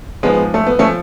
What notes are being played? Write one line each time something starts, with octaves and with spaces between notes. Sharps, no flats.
G#2 F3 G#3 B3
A3
B3
F3 A3 C#4